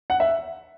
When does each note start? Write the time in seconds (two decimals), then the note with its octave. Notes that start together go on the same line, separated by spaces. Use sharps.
0.10 F#5
0.20 E5